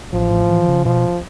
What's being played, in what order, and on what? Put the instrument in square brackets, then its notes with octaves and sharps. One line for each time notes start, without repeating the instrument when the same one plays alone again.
[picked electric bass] A1 [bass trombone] F3
[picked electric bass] A2
E3
C#3
[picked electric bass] B2 [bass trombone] F3